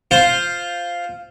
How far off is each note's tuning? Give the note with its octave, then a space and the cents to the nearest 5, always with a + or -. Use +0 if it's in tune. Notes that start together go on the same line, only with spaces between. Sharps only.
F4 +0 C5 +0